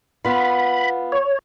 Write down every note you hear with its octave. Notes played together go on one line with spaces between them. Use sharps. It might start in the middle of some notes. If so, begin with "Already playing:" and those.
B3 F4 B5
C#5